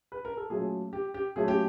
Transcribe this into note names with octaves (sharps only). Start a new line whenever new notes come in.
B4
A#4
A4
A#2 F#3 A3 C#4 G#4
G4
G4
A#2 F#3 A3 C#4 G#4
G4